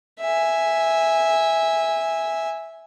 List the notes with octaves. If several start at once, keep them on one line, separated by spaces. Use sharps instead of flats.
E5 G#5